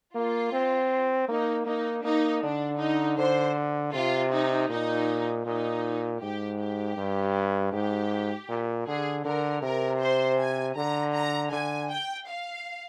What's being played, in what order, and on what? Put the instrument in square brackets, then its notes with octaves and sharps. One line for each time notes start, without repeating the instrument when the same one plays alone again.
[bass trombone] A#3 [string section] F4
[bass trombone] C4
[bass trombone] A#3 [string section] D#4
[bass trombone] A#3 [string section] D#4
[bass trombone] A#3 [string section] D#4
[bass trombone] D3 [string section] D4
[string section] D#4
[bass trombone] D3 [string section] C5
[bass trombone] C3 [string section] F4
[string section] D#4
[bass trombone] A#2 [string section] D#4
[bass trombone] A#2 [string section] D#4
[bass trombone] G#2 [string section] G4
[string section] G4
[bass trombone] G2
[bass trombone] G#2 [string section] G4
[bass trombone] A#2
[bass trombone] D3 [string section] G#4
[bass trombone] D3 [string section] A#4
[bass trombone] C3 [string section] A#4
[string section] C5
G#5
[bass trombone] D3 [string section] A#5
[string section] A#5
[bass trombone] D3 [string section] G#5
[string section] G5
F5